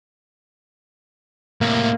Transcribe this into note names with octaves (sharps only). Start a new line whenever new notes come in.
A2 C3 A#3